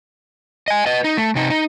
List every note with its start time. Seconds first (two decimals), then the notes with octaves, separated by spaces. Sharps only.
0.68 D#5 G#5
0.86 B4 D#5
1.04 D#4
1.17 A3
1.35 C3 D#4
1.50 D#4